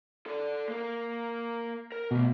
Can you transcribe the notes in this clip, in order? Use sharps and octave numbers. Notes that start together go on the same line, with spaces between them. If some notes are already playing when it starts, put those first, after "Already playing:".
A4 D5
A#3 A#4
A#4
B2 E3 A3